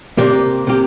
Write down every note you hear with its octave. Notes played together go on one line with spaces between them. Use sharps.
C3 A#3 G4 A#4 D5
C3 A#3 G4